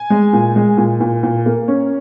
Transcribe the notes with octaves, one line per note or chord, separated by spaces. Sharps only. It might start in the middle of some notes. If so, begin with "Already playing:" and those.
Already playing: G#5
G#3
A#2
G#3
A#2
A#2
A#2
A#3
C#4